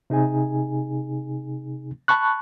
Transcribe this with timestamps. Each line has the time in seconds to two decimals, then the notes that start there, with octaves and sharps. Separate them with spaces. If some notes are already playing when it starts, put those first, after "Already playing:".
0.10 C3 D#4 G#4 G#5
2.08 A5 B5 C#6 F#6